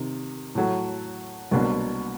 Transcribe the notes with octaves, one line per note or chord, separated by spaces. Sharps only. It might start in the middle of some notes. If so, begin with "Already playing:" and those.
Already playing: C3 D#3
A2 F#3 A3
C2 B2 F#3 A#3 D4